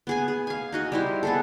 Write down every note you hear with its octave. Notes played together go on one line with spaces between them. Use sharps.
B3 G#4 G#5
G#4
F5 G#5
D#4 F#4 D#5
G3 E4 C5
B3 G#4 A4